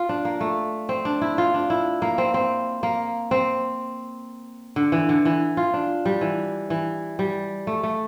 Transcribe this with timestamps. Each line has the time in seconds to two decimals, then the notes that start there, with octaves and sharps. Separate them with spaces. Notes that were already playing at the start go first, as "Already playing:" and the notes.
Already playing: F4
0.09 D4
0.25 A#3
0.40 A3
0.89 C4
1.05 D4
1.21 E4
1.38 F4
1.54 D4
1.70 E4
2.02 A#3
2.18 C4
2.34 C4
2.83 A#3
3.31 C4
4.76 D3
4.92 E3
5.09 D3
5.25 E3
5.57 F4
5.74 D4
6.05 G3
6.21 E3
6.70 E3
7.19 G3
7.67 A3
7.83 A3